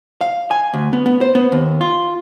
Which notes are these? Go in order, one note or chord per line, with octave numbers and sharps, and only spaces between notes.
F5
G#5
D2
B3
B3
C5
B3
D#2
F4